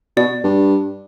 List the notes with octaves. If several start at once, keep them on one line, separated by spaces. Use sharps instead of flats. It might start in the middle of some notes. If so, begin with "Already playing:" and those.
B2 D5
G2